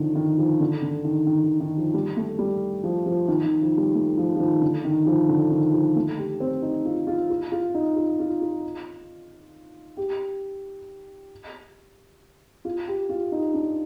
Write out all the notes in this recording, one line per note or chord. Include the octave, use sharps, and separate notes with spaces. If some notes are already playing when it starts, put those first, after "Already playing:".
Already playing: D3 D#3 F3
D#3
F3
D3
D3
D#3
D#3
D#3
D#3
F3
G3
A3
G3
F3
F3
D#3
D#3
F3
G3
A3
F3
F3
D#3
D3
D#3
F3
D3
D#3
F3
A3
G4
C4
D#4
F4
F4
F4
F4
D#4
F4
F4
F4
G4
F4
G4
F4
D#4
D4